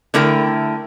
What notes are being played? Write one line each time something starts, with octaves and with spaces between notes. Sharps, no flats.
D3 A3 E4 A#4 G5